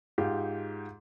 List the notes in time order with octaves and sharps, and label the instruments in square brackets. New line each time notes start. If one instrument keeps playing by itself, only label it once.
[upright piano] G#2 F4 G4